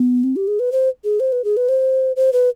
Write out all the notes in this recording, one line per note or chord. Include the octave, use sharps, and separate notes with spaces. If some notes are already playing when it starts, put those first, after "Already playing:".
Already playing: B3
C4
G4
G#4
B4
C5
G#4
C5
B4
G#4
B4
C5
C5
B4